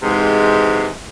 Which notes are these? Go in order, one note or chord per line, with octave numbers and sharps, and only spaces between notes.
G#2 C3 E3 G#3